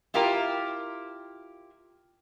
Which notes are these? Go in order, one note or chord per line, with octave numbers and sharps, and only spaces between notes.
E4 F4 G4 A#4